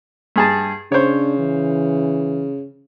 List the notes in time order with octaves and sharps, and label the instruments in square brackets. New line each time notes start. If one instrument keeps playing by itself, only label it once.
[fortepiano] G2 G#4 A5
[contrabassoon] C#3 [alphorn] D4 [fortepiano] C5 C#5
[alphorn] E3